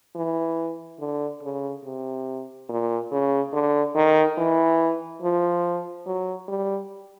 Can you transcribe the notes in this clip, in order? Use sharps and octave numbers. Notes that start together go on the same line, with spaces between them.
E3
D3
C#3
C3
A#2
C#3
D3
D#3
E3
F3
F#3
G3